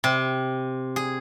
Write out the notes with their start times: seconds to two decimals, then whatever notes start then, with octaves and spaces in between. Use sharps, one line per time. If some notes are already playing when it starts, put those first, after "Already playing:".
0.04 C3
0.96 G#4